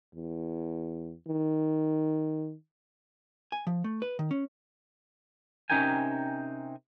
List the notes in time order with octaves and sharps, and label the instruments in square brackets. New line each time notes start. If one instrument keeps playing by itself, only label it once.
[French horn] E2
D#3
[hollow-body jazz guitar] G#5
F3
A3
B4
D#3
C#4
[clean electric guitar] C3 C#4 D#4 A#4 G5 G#5